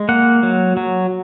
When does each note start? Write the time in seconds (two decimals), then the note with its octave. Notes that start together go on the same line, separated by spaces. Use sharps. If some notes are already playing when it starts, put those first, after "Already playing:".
Already playing: G#3
0.09 A#3 F#5
0.43 F#3
0.77 F#3